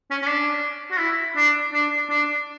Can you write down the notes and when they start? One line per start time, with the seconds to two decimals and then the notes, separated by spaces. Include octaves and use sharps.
0.11 C#4
0.22 C#4
0.27 D4
0.91 F#4
0.99 E4
1.36 D4
1.73 D4
2.10 D4